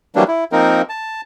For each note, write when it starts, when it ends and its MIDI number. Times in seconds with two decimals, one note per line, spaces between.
0.16 0.24 52
0.16 0.24 54
0.16 0.24 55
0.16 0.24 58
0.16 0.24 62
0.28 0.44 64
0.52 0.82 53
0.52 0.82 58
0.52 0.82 60
0.52 0.82 63
0.52 0.82 70
0.89 1.21 81